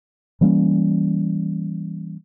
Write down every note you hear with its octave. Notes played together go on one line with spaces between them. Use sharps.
E3 G3 A#3 C#4